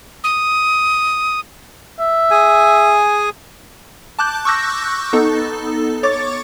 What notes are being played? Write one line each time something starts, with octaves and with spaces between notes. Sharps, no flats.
D#6
E5
G#4 G#5
A5 D6 F#6 G6
C#6 D6 E6 F#6 G6 A#6
B3 D#4 A4
C#5 C#6 D6 A6